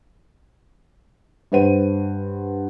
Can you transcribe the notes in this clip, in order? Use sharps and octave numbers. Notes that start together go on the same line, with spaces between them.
G2 B4 C5 F#5 D#7